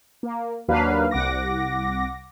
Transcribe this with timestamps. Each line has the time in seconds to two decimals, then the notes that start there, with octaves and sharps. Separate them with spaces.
0.23 A#3
0.68 D#2 F#3 A#3 D4 B4 F5
1.11 C2 F#5 D6 A#6